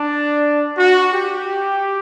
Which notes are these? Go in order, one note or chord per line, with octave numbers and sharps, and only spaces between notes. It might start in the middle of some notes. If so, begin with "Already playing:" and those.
Already playing: D4
F#4
G4